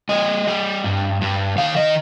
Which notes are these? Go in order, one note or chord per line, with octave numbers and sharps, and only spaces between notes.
G3 D#5
G3
G2
G2
D#3 F5
D#5